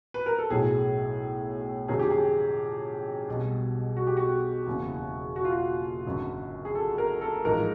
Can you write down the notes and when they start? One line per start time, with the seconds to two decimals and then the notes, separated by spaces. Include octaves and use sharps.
0.14 B4
0.26 A#4
0.39 A4
0.50 B1 A2 F#3 G#4
1.88 F2 D3 F#3 G#4
1.99 G4
2.10 G#4
3.28 B1 B2 G3
3.97 F#4
4.07 G4
4.17 F#4
4.67 F#1 E2 C#3
5.36 F#4
5.45 F4
5.52 F#4
6.06 G#1 F#2 D3
6.65 G#4
6.75 A4
6.98 A#4
7.21 A4
7.44 A1 G#2 F3 G#3 A#4